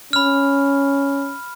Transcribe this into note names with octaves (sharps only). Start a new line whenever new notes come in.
C#4 B5 F6